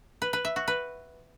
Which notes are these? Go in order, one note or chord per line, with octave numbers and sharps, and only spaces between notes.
B4
B4
E5
F#4
B4